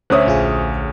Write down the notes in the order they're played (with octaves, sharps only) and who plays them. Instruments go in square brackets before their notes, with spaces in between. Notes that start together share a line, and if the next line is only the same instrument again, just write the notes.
[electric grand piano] D2 C#4 D#6 [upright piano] C5 C#5 E5 [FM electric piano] F#6
[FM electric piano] A#1 F4 G#4